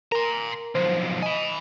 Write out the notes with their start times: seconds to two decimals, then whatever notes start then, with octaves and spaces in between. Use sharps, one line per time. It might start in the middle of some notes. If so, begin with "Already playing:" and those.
0.12 A#4 A#5 C6
0.75 B1 F2 C5
1.22 D#5 G#5 B5